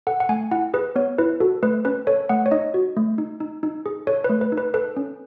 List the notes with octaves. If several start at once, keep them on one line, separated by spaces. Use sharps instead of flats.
A4 F#5
F#5
A3 G#5
E4 F#5
G#4 B4
B3 C#5
E4 B4
F#4 A4
A3 B4
C#4 B4
A4 C#5
A3 F#5
C#5
D#4 D#5
F#4
A3
D#4
D#4
D#4
G#4
A4 C#5
B4
A3
B4
D#4
B4
A4 B4
C#4